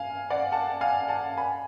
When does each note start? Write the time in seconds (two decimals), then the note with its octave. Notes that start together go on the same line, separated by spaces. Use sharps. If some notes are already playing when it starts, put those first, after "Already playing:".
Already playing: F5 G#5
0.30 D5 F#5
0.52 F#5 A5
0.81 F5 G#5
1.08 F#5 A5
1.37 G#5 B5